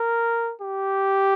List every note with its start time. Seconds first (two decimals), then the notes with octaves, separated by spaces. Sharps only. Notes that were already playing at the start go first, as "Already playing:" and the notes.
Already playing: A#4
0.61 G4